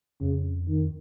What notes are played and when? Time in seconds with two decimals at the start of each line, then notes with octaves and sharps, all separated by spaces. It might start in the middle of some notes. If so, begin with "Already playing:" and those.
0.20 F2 C#3
0.68 D#3